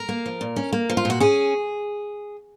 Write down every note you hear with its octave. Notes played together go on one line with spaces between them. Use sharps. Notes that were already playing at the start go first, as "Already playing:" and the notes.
Already playing: A#4
A#3
F3
A#2
C#4
A#3
F3
F4
A#2 F#4
C#4 G#4